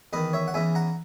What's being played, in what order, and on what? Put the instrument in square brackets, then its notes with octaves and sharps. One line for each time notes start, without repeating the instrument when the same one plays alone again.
[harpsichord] E2 D#3 B4 D#5
C#5 E5
F#5
E2 C#3 E3 E5 G#5
F#5 A#5